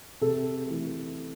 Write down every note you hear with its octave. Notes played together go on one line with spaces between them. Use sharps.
C3 A4
E3 A3